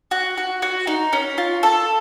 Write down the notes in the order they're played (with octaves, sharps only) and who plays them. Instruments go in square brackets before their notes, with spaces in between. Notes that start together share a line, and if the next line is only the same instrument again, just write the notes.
[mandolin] F#4
F#4
F#4
D#4
C#4
F4
A4